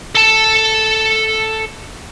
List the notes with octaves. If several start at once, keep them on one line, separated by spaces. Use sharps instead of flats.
A4 A5